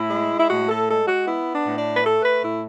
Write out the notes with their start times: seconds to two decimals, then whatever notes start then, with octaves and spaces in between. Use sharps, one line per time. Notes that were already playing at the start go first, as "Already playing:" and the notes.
Already playing: A2 E4
0.10 G#3
0.40 E4
0.48 A2 F#4
0.68 A4
0.87 G#3 A4
1.07 F#4
1.26 B3 E4
1.52 D4
1.65 A2
1.77 D4
1.95 B4
2.03 A3 A4
2.22 B4
2.41 A2 E4